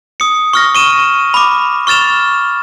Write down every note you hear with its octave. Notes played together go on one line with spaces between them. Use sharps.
D#6 C#7
C#6 F6 A#6
C#6 D#7 E7
B5 D6
C#6 F6 A6 E7 F7